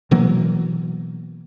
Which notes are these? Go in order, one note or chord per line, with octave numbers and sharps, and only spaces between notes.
B2 E3 F#3 A#3